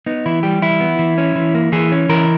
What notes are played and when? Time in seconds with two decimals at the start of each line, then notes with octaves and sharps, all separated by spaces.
0.06 B3 D#4
0.26 E3 E4
0.43 G3 G4
0.62 E3 E4
0.80 B3
0.99 E3
1.18 C#4
1.35 E3
1.54 A#3
1.72 E3 G#4
1.92 C#4
2.09 E3 A#4